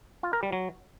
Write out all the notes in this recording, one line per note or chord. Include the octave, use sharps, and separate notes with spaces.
F4
A#4
G3
F#3